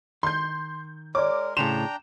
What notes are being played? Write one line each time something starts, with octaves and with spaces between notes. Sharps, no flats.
D#3 C6 G6
G#3 A#4 C#5 D5 D6
A2 C#3 D4 G5 A#5 C6 E7 F7